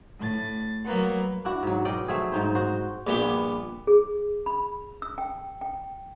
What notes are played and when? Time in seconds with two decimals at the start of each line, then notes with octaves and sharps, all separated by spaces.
0.20 A2 A6
0.85 F#3 A#3 B3
1.45 D4 E4 F#4
1.63 G#2 F#3
1.85 B2 D5 D#5 G5
2.08 F#3 A3 C4 G#4
2.32 G#2 D#4 C5
2.55 D#4 F#4 C5
3.07 A#1 G2 A#2 B3 G4 G5
3.87 G#4
4.46 B5
5.02 E6
5.18 G5
5.61 G5